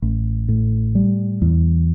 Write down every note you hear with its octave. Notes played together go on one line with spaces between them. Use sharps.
A1
A2
G3
E2